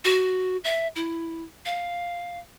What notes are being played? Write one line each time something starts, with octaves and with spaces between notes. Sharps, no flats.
F#4
E5
E4
F5